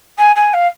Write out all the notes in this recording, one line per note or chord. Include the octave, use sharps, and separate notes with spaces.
G#5
G#5
F5